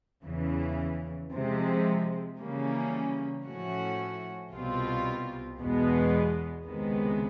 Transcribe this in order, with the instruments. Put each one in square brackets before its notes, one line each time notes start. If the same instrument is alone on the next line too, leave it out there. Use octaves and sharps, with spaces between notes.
[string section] E2 C#3 E3
C3 F3 G#3
C#3 E3 G3 A#3 C#4
A2 F3 A3 C#4 F#4
C2 B2 G3 C4 F4
E2 B2 G#3 B3
C#2 C3 D#3 G#3 B3